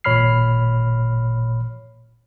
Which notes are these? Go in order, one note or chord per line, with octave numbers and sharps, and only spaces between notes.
G#1 A#2 C#5 B5 F6 C7